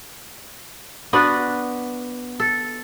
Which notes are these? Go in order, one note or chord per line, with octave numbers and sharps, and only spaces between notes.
B3 D4 F#4 B4
A4